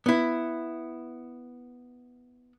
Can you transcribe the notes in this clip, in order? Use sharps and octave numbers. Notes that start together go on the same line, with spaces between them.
B3 E4